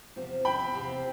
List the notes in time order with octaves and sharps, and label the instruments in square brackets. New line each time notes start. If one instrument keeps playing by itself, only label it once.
[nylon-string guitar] E2 C3 F3 C4
[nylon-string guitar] E2 C3 F3 C4 [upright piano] G5 B5
[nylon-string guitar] E2 C3 F3 C4